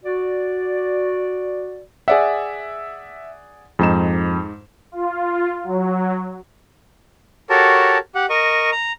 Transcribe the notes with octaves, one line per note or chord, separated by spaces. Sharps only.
F#4 D5
G#4 D5 E5 F#5
F2 G#2 D#4 E7
F4
F#3
F#4 G4 A4 A#4 C#5 A5
G4 F#5
A#4 D#5 C#6
A#5